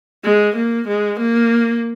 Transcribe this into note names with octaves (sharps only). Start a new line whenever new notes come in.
G#3
A#3
G#3
A#3